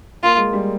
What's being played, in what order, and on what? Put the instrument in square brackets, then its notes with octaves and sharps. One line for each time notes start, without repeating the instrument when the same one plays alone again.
[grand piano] A#3 [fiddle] F4
[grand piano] G#3
G3